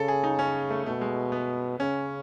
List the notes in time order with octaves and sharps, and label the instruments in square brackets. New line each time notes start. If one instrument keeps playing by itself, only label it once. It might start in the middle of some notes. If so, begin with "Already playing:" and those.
Already playing: [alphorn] C#3 [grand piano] A4
[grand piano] G#4
D#4
C#4
A3
[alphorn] B2 [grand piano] A3
[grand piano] G#3
B3
[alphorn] C#3 [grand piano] C#4